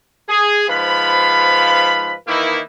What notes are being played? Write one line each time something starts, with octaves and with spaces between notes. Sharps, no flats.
G#4
G#2 F3 B4 F5 B5
D#3 E3 A#3 D#4 E4